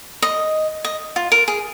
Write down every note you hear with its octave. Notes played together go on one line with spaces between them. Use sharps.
D#5
D#5
F4
A#4
G#4